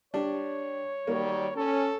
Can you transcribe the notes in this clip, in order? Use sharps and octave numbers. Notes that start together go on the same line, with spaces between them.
G3 D4 C#5
D#3 F#3 G3 A#3
C#4 A4